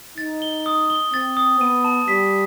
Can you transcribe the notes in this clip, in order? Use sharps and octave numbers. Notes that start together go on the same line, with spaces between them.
D#4 A6
G7
D#6
G7
C4 A6
D#6
B3 D#7
A5
G3 B6